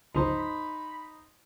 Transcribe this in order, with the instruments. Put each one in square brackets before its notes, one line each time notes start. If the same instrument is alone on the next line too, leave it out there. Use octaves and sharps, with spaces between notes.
[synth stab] G1 C#2 F3 [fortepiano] D#4 C5 [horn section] B5